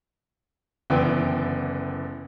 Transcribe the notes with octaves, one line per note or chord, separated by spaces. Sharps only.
F#1 D3 E3 B3 G5